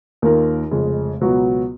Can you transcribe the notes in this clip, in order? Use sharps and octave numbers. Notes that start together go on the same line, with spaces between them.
D#2 D#3 A#3 F4 A#4
F1 F2 C#3 G#3
C#2 B2 F#3 B3 F#4